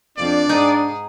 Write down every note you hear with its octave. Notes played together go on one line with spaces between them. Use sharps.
F2 C4 D4 D5
G#2 D#4 G#4